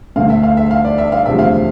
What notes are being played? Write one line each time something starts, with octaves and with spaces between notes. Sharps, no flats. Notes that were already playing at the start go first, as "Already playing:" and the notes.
D2 D3 A3 F5
E5
F5
E5
F5
D5
E5
F5
E1 D2 C3 F3 E5
F5